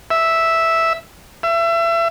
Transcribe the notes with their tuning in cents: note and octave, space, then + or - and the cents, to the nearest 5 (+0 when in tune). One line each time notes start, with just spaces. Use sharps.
E5 -5
E5 +30